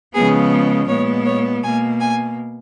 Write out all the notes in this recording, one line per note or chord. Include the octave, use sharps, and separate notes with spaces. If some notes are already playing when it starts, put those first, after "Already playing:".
C#3 F3 G#3 B3 G#4
A#2 G#3 B3 C#5
C#5
B2 A#3 G#5
G#5